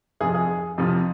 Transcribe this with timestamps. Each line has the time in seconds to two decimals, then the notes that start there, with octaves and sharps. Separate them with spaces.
0.20 F2 C3 F3 G#4
0.35 G#4
0.78 F2 C3 F3